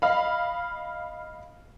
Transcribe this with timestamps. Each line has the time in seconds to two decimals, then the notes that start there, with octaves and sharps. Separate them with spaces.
0.02 D#5 F5 B5